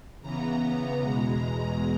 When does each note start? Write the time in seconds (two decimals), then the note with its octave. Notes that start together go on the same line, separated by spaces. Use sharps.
0.21 C#3 E3 B3 A#5
0.99 E2 B2 G#3